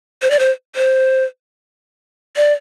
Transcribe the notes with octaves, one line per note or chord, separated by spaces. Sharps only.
C5
D5
C5
C5
D5